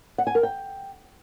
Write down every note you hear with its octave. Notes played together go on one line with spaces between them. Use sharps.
F#5
G#5
A#4
G5